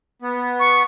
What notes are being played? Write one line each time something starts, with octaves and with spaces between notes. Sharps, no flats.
B3
C#6